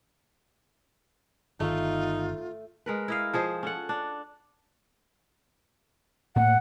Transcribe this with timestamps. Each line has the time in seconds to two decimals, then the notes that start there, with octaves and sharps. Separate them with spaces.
1.60 G1 D#3 A3 D#4 F4
2.86 G#3 A#4 B4
3.08 E4 D#5 F5
3.33 F3 G#4 C5 D#5
3.63 C#4 A4 F#5
3.89 D4
6.36 A2 A#3 F#5